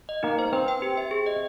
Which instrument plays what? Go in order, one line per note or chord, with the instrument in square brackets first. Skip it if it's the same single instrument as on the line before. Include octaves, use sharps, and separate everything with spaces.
[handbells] D#5
[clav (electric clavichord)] A#3 [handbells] D#4
[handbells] C5
[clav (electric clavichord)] C4 [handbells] B4
[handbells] G5
G4
E5
G#4
D#5